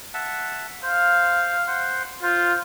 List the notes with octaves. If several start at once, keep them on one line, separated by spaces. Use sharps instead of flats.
E5 F#5 A5
C5 F5
C5 F#5 C6
F4 C5